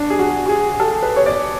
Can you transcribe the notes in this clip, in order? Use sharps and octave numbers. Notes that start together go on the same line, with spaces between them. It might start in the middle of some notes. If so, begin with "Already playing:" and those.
Already playing: D4
G#4
F#4
F#4
G#4
A4
B4
C#5
D5